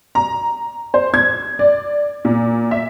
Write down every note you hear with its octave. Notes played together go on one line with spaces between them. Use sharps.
A#5
C5
G#6
D5
A#2
E5